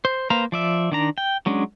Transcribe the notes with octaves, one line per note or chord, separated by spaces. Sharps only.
C5
A#3 B4 C5 F5 A#5
F3 D5 E5
D#3 D4 A#5
G5
F#3 G#3 C#4 D4